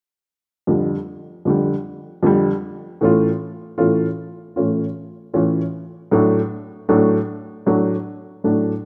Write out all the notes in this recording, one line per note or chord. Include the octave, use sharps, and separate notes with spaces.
F2 D3 G3
F2 D3 G3
F2 D3 G3
A2 E3 A3 C#4 F4
A2 E3 A3 C#4 F4
A2 E3 A3 C#4 F4
A2 E3 A3 C#4 F4
A2 F#3 A3 D4
A2 F#3 A3 D4
A2 F#3 A3 D4
A2 F#3 A3 D4